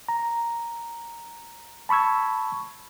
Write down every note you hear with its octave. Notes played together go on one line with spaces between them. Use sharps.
A#5
A5 B5 C#6 E6 G#6